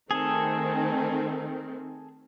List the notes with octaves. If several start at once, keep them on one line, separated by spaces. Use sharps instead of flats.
D#3 A3 C4 G#4 A4